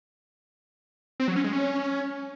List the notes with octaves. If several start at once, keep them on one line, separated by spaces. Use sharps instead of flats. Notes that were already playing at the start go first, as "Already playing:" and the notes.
C4
F#3
C#4
G#3
C#4